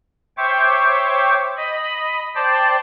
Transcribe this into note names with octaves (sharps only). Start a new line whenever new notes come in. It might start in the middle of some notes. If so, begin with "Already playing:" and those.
C5 C#5 E5 G5 C#6 D6
D#5 B5
C5 D5 G5 A5